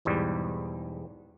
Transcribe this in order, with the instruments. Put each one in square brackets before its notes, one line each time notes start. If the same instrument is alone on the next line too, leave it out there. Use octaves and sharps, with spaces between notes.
[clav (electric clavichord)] B1 E2 G#2 G3